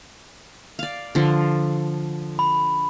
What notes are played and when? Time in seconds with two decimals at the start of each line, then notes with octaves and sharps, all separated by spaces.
0.79 D5 F5
1.15 D3 F3
2.39 B5